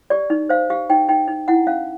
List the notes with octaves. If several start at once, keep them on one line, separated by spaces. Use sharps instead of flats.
G4 D5
D#4
C5 F5
G4 F5
D#4 G5
D#4 G5
D#4
E4 F#5
C#4 F5